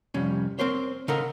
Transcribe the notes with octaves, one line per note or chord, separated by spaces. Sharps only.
C2 F2 G3 C#4
C4 A#4 C5 C#5
C#3 A4 A#4 D#5 F#5 A#5